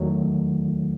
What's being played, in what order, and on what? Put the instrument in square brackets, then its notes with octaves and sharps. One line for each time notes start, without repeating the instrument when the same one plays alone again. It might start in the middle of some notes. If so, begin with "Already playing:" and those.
Already playing: [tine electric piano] E2 D#3 F#3 A3